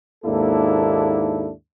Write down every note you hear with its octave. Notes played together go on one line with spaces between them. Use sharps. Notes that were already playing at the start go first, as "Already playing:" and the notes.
D#2 G#2 A#3 D4 E4 A4